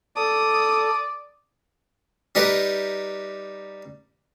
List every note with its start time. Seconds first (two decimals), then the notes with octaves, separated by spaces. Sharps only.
0.16 A4 D5 D#6
2.35 G3 D#4 G4 A#4 B4